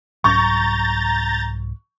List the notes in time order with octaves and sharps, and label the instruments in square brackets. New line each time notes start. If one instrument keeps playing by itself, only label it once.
[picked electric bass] C2 G#2 F#3 [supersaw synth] A#5 G6 A6 [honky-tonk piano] C#6